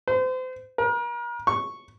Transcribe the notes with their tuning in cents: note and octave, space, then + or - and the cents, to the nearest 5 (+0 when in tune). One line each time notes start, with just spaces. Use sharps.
C5 -35
A#4 +40
C#6 -5